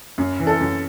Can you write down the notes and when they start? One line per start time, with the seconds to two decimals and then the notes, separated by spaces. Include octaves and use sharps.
0.18 F#2
0.40 E3
0.47 A4
0.61 F#2